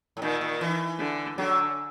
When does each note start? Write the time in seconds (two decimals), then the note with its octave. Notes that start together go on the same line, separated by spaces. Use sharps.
0.17 A2
0.22 A#2 D#3
0.41 A#2
0.61 E3
1.00 D3
1.38 D3 F#3